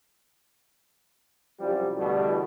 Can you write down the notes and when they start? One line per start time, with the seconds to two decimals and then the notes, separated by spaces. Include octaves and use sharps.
1.60 C2 F#2 F3 G3
1.98 E2 B2 D3 E3 G3 A3